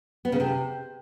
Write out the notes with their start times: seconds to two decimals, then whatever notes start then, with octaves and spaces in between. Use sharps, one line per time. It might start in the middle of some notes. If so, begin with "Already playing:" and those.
0.25 B3
0.32 C#3
0.40 C3